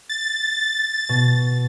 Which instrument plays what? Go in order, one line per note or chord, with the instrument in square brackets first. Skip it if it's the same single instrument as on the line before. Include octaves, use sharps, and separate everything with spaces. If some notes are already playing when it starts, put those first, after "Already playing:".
[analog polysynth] A6
[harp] B2